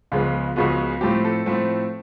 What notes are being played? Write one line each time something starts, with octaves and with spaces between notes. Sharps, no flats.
C#2 C#3 F3 G#3 B3 F4
C#2 C#3 F3 G#3 B3 F#4
A2 F3 A3 C4 G4
A4
A2 F3 A3 C4